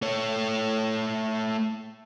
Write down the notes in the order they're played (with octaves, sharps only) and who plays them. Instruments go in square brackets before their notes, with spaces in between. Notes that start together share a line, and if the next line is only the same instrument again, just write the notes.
[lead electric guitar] A3 C#5